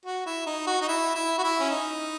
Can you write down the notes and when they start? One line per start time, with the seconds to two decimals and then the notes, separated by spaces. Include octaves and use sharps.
0.06 F#4
0.26 E4
0.46 D#4
0.67 F#4
0.82 D#4
0.88 E4
1.15 E4
1.38 F#4
1.43 E4
1.60 C#4
1.70 D#4